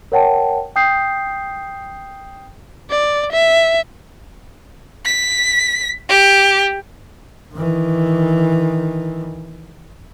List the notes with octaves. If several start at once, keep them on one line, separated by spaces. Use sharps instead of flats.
A#4 C#5 F#5 G5 A5
G5 D#6 G6 C7
D5
E5
B6
G4
D#3 E3